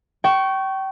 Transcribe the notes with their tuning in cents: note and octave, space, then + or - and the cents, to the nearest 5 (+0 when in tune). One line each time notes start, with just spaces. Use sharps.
G5 -30 C#6 +0